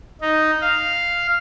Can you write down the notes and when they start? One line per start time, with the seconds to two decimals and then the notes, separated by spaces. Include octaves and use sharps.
0.21 D#4
0.61 F5